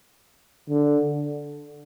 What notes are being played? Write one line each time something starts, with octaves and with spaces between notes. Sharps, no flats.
D3